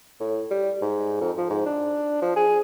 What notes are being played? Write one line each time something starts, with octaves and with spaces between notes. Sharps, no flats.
A2
G3
G#2
F2
F3
G#2
D4
F3
G#4